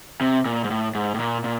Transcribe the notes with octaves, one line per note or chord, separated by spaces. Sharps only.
C3
A#2
G#2
A2
G#2
A2
A#2
A#2